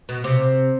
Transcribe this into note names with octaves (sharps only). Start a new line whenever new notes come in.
B2
C3